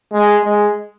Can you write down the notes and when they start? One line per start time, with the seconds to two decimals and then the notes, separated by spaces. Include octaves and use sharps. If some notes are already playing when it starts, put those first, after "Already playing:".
0.12 G#3
0.43 G#3